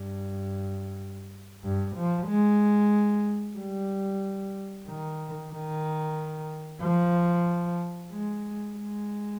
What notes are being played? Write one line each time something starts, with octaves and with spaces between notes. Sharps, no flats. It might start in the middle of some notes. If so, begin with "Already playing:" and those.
Already playing: G2
G2
F3
G#3
G3
D#3
D#3
F3
G#3
G#3